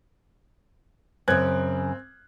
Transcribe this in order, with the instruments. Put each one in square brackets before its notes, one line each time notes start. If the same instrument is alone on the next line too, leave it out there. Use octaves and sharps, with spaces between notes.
[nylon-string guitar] F#2 C#3 [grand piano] C4 F#6 G#6